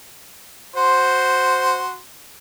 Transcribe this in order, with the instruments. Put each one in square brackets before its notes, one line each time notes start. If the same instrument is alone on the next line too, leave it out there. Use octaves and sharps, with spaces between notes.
[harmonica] F#4 C6 [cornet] C5